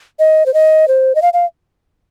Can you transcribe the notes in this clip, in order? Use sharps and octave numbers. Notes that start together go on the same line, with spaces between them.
D#5
C5
D#5
C5
D#5
F5
F5